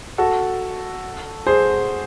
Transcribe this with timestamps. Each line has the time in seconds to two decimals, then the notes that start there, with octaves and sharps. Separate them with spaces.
0.18 F#4 A4
1.47 G#4 C5